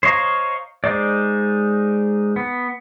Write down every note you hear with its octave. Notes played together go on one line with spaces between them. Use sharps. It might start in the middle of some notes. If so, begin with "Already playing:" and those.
C5 C#5 D#5 F5 A#5
G#3 D#4 C5 D5
B3